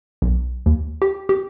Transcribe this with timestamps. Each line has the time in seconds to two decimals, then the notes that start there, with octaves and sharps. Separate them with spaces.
0.22 B1
0.66 D#2
1.02 G4
1.29 G4